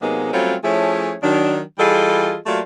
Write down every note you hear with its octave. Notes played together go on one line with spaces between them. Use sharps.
C3 F#3 G#3 A#3 B3 D#4
F#3 G3 A3 C4 C#4 F4
F3 A3 C#4 E4 G#4 C#5
D#3 F#3 D4
E3 G3 F4 G#4 A4 D#5
F#3 A3 A#3 F4 G4 D5